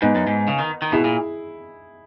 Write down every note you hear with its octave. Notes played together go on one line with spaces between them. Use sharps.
G#2 B3 D#4
F#2
G#2
C#3
D#3
D#3
B2 E4 G#4
A#2